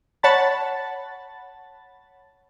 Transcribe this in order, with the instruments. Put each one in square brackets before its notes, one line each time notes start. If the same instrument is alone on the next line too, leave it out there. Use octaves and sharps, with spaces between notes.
[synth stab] C#5 F#5 A5 B5 A6